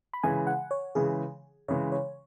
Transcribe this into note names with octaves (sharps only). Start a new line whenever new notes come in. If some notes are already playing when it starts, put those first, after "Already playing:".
B5
C#3 E3 G#3 G#5
F#5
C#5
C#3 E3 G#3 G#4
C#3 E3 G#3 C#5
C#5